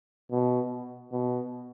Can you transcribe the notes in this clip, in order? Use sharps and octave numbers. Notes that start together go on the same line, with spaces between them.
B2
B2